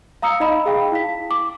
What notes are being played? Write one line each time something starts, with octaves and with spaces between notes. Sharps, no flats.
F5 A#5 D#6 E6 C#7
D#4 D#5 F5 B5
G#4 F5 G5
E4 F5 B6
D6